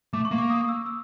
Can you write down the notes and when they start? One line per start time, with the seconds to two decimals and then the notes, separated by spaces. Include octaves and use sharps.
0.13 A3 D6
0.25 C#6
0.31 A#3
0.38 D6
0.50 D#6
0.69 E6
0.86 E6